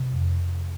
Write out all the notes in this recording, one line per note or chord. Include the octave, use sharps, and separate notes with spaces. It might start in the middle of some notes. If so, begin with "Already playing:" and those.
Already playing: C3
F2